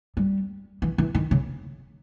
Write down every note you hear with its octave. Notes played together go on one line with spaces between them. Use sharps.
G3
E3
E3
D#3
C#3